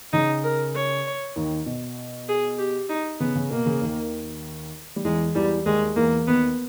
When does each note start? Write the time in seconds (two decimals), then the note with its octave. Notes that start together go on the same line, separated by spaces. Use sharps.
0.13 C#3 D#4
0.44 A#4
0.75 C#5
1.36 D#2 D#3
1.66 B2
2.29 G#4
2.58 G4
2.89 D#4
3.20 C#3 B3
3.35 C#3
3.51 B2 A#3
3.66 C#3
3.81 D#2 D#3
4.96 G3
5.04 E2 E3 G#3
5.35 E2 E3 G3
5.66 D#2 D#3 G#3
5.96 E2 E3 A#3
6.27 D#2 D#3 B3